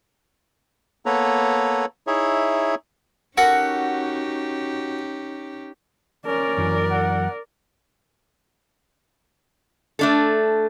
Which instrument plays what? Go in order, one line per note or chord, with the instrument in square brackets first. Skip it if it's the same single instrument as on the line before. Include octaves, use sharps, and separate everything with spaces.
[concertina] A#3 B3 A4 B4 C#5 A#5
D#4 E4 G#4 C#5 E5
[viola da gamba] C#4 D#4 G4 [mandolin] F#4 [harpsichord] A4 A#4 F#5
[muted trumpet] C#4 [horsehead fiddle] A#4 D5
[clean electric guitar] F#2 E3 F#3
[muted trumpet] F#5
[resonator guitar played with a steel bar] A3 D4 A4